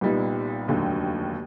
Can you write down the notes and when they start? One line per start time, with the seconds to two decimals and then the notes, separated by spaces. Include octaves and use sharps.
0.01 C2 A#2 G3 B3 D#4
0.68 F1 D#2 D3 F#3